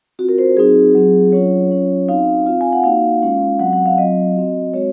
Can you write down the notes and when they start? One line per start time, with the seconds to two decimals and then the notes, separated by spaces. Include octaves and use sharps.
0.19 C4 F4 F#4
0.29 A#4
0.38 C5
0.57 F#3 C4 D#4 F#4 G#4
0.95 F#3 C4 F4
1.32 F#3 C#4 F4 C#5
1.71 F#3 C#4 F4
2.08 C4 D#4 F#4 F5
2.46 C4 F4
2.61 G#5
2.73 F#5
2.84 A#3 D#4 F#4 F5
3.22 G#3 C#4 F4
3.59 F#3 C4 F#4 F#5
3.73 F#5
3.86 F5
3.98 F#3 C4 F4 D#5
4.36 C4 F#4
4.73 G#3 C4 F#4 C#5